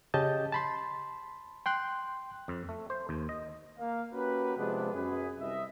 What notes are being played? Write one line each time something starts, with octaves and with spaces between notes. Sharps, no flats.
C#3 C#4 G4 D#5 A5 G6
A5 B5 C6
G5 C6 F#6
F2
A3
C5
D#2
D#5
A#3 F5
A#3 C#4 F#4 G4 A#4 B4
C3 F3 G#3 B3 D4 B4
F#2 G#4 B4
C2 D#5 E5